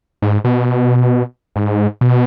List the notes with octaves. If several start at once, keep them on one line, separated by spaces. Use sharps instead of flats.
G#2
B2
G#2
B2